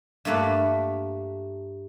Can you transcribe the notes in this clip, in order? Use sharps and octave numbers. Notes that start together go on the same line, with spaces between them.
G2 A3 A#3 A4 B4